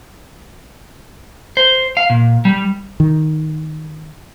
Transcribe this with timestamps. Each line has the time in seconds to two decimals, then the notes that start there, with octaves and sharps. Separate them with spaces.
1.57 C5
1.97 F5
2.10 A#2
2.45 G3
3.00 D#3